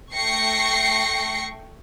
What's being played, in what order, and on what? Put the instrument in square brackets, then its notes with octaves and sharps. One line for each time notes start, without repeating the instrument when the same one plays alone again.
[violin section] A3 G5 C#6 A#6 C7 C#7